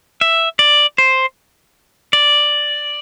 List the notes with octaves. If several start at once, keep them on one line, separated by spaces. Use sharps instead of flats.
E5
D5
C5
D5